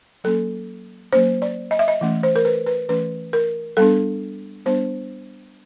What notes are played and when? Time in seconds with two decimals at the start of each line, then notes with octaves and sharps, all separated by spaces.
0.24 F#3 A#3 C#4 A4
1.13 F#3 A#3 C#4 C5
1.42 D5
1.71 D#5
1.79 E5
1.88 D#5
2.01 E3 A3 C#4
2.23 C5
2.36 A#4
2.45 B4
2.66 B4
2.89 E3 A3 C#4 B4
3.33 A#4
3.77 G3 B3 D4 A4
4.66 G3 B3 D4 C5